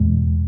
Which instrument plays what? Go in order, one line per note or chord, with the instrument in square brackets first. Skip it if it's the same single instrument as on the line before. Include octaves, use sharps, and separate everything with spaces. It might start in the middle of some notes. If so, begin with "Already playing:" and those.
Already playing: [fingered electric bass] E2 B2 G#3